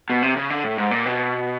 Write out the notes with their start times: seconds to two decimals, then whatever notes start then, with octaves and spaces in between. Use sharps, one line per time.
0.10 B2
0.22 C3
0.37 C#3
0.50 D3
0.64 A2
0.78 G#2
0.91 A#2
1.06 B2